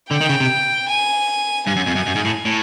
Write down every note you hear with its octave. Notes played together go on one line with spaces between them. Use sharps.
D3 G5
D#3
C#3
C3
G#5
G2 G#5
F#2
F2
F#2
F#2
G#2
A2
A2